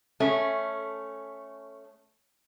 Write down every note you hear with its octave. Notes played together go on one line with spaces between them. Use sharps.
A3 C#4